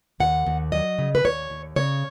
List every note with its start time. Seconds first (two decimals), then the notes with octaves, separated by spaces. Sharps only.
0.20 D#2 F#5
0.46 D#2
0.72 F#3 D#5
0.98 C#3
1.15 B4
1.24 D#2 C#5
1.50 D#2
1.76 C#3 C#5